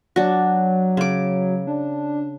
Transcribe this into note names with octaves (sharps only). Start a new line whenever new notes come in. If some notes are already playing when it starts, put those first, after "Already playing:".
F#3 D4 F#4
C#3 D6
D4